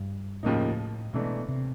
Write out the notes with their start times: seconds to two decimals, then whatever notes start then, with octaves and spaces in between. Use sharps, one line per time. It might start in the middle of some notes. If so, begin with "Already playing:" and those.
Already playing: G2
0.43 D#2 A2 C#3 F3 A#3 D#4
1.13 G#2 B2 E3 A3 D4
1.49 C3